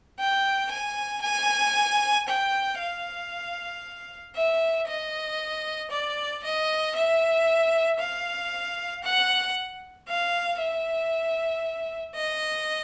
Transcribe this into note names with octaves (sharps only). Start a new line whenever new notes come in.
G5
G#5
G#5
G5
F5
E5
D#5
D5
D#5
E5
F5
F#5
F5
E5
D#5